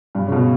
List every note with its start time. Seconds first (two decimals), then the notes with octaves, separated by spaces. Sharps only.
0.15 G2
0.27 C#3
0.32 B2